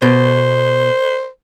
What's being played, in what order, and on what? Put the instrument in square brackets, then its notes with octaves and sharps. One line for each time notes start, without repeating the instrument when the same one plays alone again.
[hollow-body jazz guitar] B2 [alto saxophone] C5